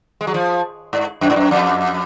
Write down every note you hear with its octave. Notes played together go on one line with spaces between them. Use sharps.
G#3
F#3
F3
G#2
F#2
G#2
F#2
F2